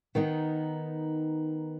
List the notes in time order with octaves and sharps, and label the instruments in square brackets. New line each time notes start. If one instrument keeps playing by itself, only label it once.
[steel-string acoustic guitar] D#3 B3 D#4